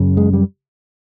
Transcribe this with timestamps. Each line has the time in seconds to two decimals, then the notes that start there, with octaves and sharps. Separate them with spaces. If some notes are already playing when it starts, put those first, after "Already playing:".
Already playing: F#2 C#3
0.17 G#3
0.33 G3